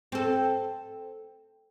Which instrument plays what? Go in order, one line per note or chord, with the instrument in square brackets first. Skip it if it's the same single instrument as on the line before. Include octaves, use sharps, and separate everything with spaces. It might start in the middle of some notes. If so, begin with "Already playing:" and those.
[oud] C4 A4